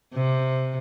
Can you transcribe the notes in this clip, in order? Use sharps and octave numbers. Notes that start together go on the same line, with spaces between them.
C3